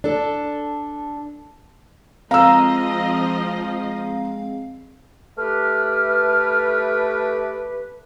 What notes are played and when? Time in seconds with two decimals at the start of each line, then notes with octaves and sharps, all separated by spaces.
0.04 D4 A4
2.31 F3 G#3 C4 D#5 F5 A#5 E6
5.38 A3 G4 B4 F6